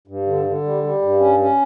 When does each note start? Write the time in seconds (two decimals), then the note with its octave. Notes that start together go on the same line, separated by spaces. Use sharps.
0.08 G2
0.27 D3
0.46 D3
0.64 G3
0.83 G3
1.02 G2
1.20 C#4
1.39 C#4